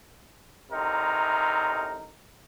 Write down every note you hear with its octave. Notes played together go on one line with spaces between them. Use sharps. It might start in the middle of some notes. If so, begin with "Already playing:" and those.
A1 C3 D#4 A#4